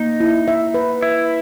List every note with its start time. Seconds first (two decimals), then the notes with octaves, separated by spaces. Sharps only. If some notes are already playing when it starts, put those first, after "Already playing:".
Already playing: A#3 D#4
0.20 E4
0.48 E5
0.74 B4
1.02 E4 E5